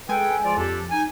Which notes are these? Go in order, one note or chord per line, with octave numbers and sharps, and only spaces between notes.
G#3 G#4 A4 B4 G5 G#5
F3 F4 D5
F2 D4 G4 A4
D#4 G#5